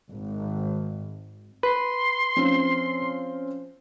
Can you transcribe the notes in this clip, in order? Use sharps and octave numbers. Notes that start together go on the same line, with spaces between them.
G#1
B4 C6
F3 C4 C#4